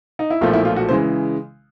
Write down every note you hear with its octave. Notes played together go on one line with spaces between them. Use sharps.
D#4
E4
B1 A#2 F3 A3 F4
E4
F4
F#4
C#3 E3 G#3 C5